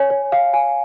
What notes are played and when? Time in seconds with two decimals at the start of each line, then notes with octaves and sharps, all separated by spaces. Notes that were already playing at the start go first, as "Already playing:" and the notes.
Already playing: C#5 G#5
0.10 C#5
0.32 F5
0.53 G#5